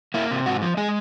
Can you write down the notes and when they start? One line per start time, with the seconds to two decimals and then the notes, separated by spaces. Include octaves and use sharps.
0.14 A#3 E4
0.31 C3
0.46 G#2 F#4
0.62 F3
0.77 G#3 G#4